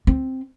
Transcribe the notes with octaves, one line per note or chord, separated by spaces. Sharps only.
C4